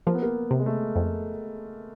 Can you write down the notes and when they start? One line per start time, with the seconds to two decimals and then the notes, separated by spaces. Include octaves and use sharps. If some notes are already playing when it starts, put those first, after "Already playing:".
0.07 F3 A#3
0.15 B3
0.22 A#3
0.51 C3
0.59 G#3
0.66 A3
0.96 F2